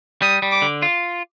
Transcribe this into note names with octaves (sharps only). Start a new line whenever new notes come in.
G3 D#6
G3
D6
D3
F4